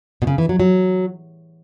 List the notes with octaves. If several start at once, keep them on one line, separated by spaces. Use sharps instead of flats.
B2
C#3
E3
F#3
F#3